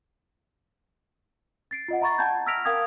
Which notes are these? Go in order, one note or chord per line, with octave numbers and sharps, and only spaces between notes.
A6 C7 D7
F4 D#5 F#5
E5 A#5 B5 C#6 A6
F#5 G5 A5 B5 G6 G#6
E6 F6 A#6 B6 D7 F7
A#4 F5 G5 D#6 G#6